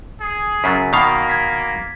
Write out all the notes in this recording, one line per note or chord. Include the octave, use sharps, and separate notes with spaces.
G#4
F#2 C#3 F#3 A6 B6
B2 D#3 A#3 F5
G#6 B6